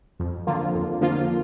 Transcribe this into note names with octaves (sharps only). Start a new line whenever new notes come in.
F2
D3 F3 A#3 F4
F2
D3 F3 A#3 F4